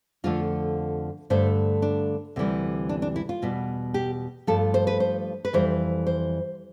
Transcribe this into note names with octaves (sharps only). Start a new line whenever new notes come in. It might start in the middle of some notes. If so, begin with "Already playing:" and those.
F2 D3 F3 A3 F4
G2 D3 A3 C5
D4
D2 C3 E3 G3
D4
D4
E4
F4
E2 B2 G3
G4
G2 F3 A3 A4
C5
B4
C5
B4
F2 E3 G3 C5
C5